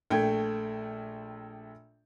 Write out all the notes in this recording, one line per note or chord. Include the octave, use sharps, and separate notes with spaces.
A#1 A3 G5 G#6